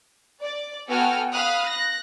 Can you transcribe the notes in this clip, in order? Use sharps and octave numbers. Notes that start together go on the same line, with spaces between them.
D5
B3 F#4 A4 G5 G#5 F6
F5 B5 D#6 F6 F#6
F#6 A#6